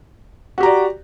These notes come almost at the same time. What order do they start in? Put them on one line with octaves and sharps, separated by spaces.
F#4 G4 A#5 D5